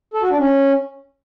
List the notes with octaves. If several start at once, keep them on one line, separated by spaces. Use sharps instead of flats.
A4
F#4
D4
C#4